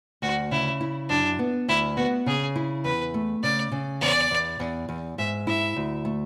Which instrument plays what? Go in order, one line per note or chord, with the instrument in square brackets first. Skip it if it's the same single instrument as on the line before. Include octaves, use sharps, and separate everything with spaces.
[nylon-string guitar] D2 [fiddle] F#4
[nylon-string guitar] C#3 [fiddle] E4
[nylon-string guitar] E4
[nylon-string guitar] F#2 [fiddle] D4
[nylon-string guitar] B3
[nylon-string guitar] D2 [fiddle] E4
[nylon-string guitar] B3 [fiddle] F#4
[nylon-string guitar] C#3 [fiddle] G#4
[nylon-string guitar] E4
[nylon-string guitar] E2 [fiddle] B4
[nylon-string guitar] A3
[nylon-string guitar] C#3 [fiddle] D5
[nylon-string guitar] C#3
[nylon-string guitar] E2 [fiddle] D5
[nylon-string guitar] E2
E2
E2
[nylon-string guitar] G#2 [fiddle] E5
[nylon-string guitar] E4 [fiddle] E5
[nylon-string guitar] D2
A3